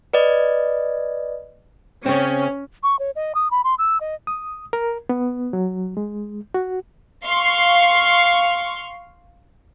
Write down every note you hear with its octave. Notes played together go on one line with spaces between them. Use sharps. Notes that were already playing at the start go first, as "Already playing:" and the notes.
B4 D5 D#5
C#3 C4 C#4
C#6
C#5
D#5
D#6
B5
C6
E6
D#5
D#6
A#4
B3
F#3
G#3
F#4
F5 C6 C#6